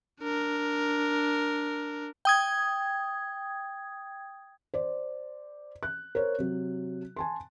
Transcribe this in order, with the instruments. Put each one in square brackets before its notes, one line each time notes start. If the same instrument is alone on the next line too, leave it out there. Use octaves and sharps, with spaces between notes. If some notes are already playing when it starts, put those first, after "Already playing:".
[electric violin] D4 A#4
[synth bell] G5 D#6 G#6
[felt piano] C5 D5
F#6
A#4 C5 C#5
C3 F#3
G#5 A5 C6